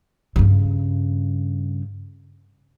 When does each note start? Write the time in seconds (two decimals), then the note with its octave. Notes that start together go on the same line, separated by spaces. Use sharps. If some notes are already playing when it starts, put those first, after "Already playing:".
0.36 G2 C#3